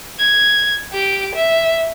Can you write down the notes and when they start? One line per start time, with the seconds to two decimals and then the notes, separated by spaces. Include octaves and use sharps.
0.19 G#6
0.93 G4 D6
1.34 E5